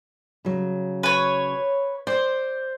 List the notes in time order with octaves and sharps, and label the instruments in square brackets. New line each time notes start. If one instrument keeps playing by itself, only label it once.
[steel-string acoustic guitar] C#3 F#3
[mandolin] B4 C#5
[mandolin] C5 [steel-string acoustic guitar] D5